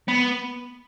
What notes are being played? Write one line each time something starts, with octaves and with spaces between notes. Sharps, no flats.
B3